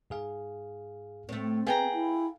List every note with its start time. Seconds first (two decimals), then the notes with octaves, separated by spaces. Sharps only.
0.10 G#2 G#4 F5
1.29 A2 A3 C4
1.67 B3 G#4 F5 G5 A#5
1.94 E4